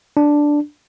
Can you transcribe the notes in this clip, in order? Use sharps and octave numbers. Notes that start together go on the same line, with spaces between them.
D4